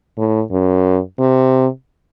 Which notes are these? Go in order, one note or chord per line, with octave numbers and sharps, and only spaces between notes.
A2
F#2
C3